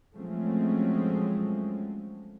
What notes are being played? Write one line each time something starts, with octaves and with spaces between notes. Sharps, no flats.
F3 F#3 G#3 A3 C4 C#4